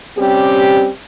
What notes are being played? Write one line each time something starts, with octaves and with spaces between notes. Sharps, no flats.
G3 C4 C#4 G4